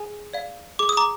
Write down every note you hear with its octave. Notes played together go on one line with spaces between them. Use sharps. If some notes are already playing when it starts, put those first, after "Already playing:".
Already playing: G#4 G#5
D5 F5
G#4 D6
D#6
A#5 D6